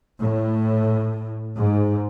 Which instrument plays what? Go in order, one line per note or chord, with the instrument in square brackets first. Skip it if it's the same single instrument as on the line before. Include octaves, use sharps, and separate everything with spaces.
[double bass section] A2
G#2